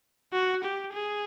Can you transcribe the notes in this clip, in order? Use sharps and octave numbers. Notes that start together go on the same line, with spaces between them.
F#4
G4
G#4